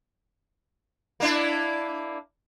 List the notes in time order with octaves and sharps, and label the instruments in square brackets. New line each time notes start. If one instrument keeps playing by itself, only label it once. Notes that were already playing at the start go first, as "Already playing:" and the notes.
[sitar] A#3 D4 E4